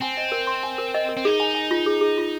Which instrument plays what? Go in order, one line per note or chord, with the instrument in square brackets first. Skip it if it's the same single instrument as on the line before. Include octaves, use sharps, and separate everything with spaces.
[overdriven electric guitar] C4 [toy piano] G#5
[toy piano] D#5
A#4
C6
G#5
A#4
D#5
A#4
[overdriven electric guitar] C4
[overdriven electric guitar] D#4 [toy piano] G#4
[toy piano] G#5
G#5
F4
G#4
G#4
F4